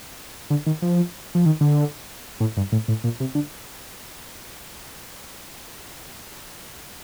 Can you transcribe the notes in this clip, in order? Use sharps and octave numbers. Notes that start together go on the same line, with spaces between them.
D3
D#3
F3
F3
D#3
D3
A2
G2
A2
A2
A#2
C3
D3